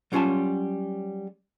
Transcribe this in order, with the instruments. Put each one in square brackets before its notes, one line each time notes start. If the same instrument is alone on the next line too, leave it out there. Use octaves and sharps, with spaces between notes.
[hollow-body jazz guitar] F#3 G3 C#4 F4 G#5 A5